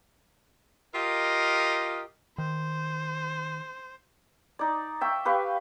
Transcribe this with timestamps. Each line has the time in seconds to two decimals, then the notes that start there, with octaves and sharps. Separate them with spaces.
0.95 F4 G4 A#4 D#5
2.38 D#3 C5
4.59 D#4 D5
5.01 E5 G5 C#6
5.25 G4 B4 F5 C#6